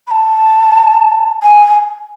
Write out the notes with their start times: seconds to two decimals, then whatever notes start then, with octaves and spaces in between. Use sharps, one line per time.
0.07 B5
0.10 A5
1.42 G#5